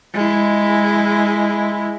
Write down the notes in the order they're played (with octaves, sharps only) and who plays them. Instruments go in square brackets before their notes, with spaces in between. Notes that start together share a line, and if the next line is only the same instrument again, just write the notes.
[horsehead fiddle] G#3 E4